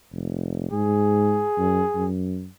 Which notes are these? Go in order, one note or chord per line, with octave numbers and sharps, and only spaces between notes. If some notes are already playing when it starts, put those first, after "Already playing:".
F1
G#2 G#4
F#2
F#2